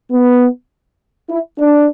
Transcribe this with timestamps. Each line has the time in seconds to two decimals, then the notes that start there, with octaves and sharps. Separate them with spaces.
0.10 B3
1.29 E4
1.59 D4